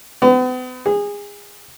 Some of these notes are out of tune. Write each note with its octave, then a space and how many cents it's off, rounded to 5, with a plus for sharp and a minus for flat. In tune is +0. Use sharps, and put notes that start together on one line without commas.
B3 +40
G#4 -25